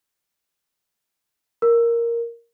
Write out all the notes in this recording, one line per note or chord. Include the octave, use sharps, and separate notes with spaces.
A#4